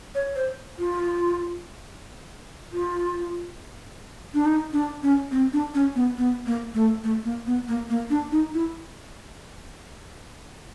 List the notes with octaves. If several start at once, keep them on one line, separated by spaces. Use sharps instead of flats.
C#5
C5
F4
F4
D4
D#4
D4
C#4
C4
D4
C#4
B3
B3
A#3
A3
A3
A#3
B3
A#3
A#3
D4
D#4
E4